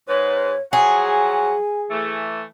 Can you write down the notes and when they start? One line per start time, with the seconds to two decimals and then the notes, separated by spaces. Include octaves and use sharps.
0.08 G#2 B4 C#5
0.73 F3 F#3 G#4 F#5 G#5
1.91 E3 A3